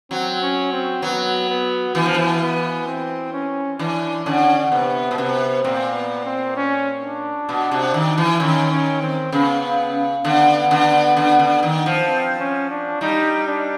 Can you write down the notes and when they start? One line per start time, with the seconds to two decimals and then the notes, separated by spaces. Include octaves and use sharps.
0.11 F#3 C4
0.42 C#4
0.72 C4
1.02 F#3 B3
1.49 B3
1.95 E3 B3
2.06 F3
2.14 E3
2.41 B3
2.87 C4
3.33 C#4
3.79 E3 D4
4.25 D3 C#4
4.72 C3 B3
5.11 B2
5.17 C3 B3
5.64 A#2 C4
5.94 B3
6.25 C4
6.56 C#4
7.02 D4
7.49 B2
7.71 C3
7.94 D#3
8.18 E3
8.40 D#3 C#4
8.71 C#4
9.02 C4
9.32 C#3 B3
10.25 D3 B3
10.71 D3
11.17 D3
11.39 D3
11.63 D#3
11.86 F3
12.09 C4
12.40 C#4
12.70 D4
13.01 G3 D#4
13.47 D4